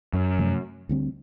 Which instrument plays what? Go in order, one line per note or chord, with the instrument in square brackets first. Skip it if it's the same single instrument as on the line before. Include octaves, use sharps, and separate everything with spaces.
[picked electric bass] F#2
[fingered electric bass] C3 F3 A3
D2 D3 G3 C4